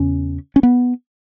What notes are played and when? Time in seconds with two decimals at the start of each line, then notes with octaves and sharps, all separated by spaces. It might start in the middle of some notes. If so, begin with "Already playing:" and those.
Already playing: E2 C#3 C#4
0.56 C#4
0.63 B3